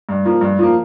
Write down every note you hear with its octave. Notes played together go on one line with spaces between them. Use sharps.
G2
F3 A#3
G2
F3 A#3